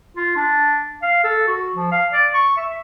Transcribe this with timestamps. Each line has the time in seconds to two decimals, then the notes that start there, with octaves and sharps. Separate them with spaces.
0.16 F4
0.36 D4
1.02 F5
1.24 A4
1.48 F#4
1.76 F3
1.92 F5
2.13 D5
2.34 C#6
2.57 E5